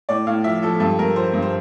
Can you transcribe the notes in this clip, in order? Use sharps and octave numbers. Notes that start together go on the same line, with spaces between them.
A2 D5
A2 F5
F3 E5
F3 A4
G2 A4
G2 A#4
F3 C5
G2
C5